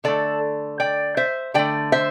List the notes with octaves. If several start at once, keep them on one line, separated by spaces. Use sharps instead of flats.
D3 A3 A4 D5
D5 G5
C5 E5
D3 A3 D5 G5
C5 E5